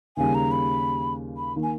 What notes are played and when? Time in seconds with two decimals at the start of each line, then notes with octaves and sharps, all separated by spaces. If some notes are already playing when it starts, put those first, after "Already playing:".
0.17 D#2 C#3 G3 G#5
0.35 A#5
0.51 B5
1.37 B5
1.56 D#3 A#3 D#4
1.63 G#5